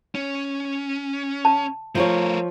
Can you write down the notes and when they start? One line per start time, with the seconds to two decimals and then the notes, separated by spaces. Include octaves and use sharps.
0.15 C#4
1.45 A5
1.95 F3 A3 F4 A#4 C#5